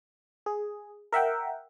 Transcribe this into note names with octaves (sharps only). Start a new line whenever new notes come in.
G#4
A#4 E5 F#5 G5